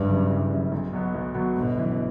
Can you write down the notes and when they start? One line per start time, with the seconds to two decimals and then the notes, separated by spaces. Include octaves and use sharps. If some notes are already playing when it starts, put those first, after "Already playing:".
Already playing: F#1 G2
0.09 F#2 C#3
0.30 F#1
0.51 F#2 C#3
0.72 B1
0.93 B2 F#3 B3
1.15 B1
1.35 B2 F#3 B3
1.56 G1 B2
1.77 F#2 E3